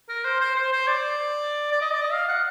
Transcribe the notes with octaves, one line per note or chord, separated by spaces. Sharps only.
A#4
C5
C5
C5
C5
D5
D5
D#5
D5
D#5
F5
F#5